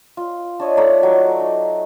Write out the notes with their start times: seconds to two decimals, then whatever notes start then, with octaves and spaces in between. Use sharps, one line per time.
0.17 F4
0.60 D4 C#5 D#5
0.77 A3 D#4 D5 A#5
1.03 F#3
1.40 D#4